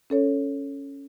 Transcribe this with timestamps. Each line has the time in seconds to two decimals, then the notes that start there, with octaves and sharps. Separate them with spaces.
0.10 C#4 A4 C#5